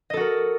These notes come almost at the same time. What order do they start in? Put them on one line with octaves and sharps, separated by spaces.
D#5 A4 F#4 A#4